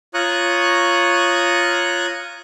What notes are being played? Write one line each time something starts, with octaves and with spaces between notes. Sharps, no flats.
F4 C#5 A#5 C#6 D#6 F#6